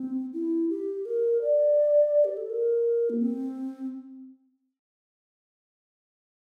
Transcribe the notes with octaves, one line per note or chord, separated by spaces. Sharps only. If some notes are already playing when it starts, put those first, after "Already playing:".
Already playing: C4
E4
G4
A#4
D5
G4
A4
A#4
A#3
C4